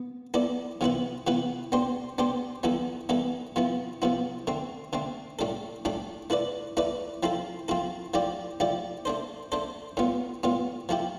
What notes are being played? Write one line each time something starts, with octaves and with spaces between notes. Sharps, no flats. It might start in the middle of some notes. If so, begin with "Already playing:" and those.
Already playing: B3
B3 E4 A4 D5
C3 E3 B3 E4 B4
C3 E3 B3 E4 B4
B3 D4 G4 C5
B3 D4 G4 C5
E3 G3 B3 E4 A4
E3 G3 B3 E4 A4
C3 F3 B3 E4
C3 F3 B3 E4
D3 A3 C4
D3 A3 C4
A2 G3 D4 A4
A2 G3 D4 A4
A3 E4 B4 D5
A3 E4 B4 D5
F3 C4 E4 A4
F3 C4 E4 A4
F3 A3 E4 G4 D5
F3 A3 E4 G4 D5
A3 D4 A4 C5
A3 D4 A4 C5
A2 G3 B3 F4
A2 G3 B3 F4
F3 A3 E4 G4